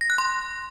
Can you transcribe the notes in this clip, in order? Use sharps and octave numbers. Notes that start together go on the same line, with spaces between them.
A#6
F#6
C6